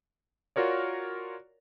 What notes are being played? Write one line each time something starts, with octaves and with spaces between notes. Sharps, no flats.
F4 F#4 A#4 C#5 D5